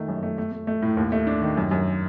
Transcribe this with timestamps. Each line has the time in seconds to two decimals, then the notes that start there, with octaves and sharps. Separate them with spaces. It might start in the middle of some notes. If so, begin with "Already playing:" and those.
Already playing: D#3 A3
0.08 F#2
0.23 A3
0.38 A3
0.52 A3
0.67 A3
0.82 A2
0.97 D#2
1.12 A3
1.27 D4
1.42 D#3
1.57 F#2
1.71 F#2